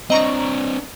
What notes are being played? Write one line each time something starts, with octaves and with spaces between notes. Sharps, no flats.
C4 D4 D#5 A#5 C#6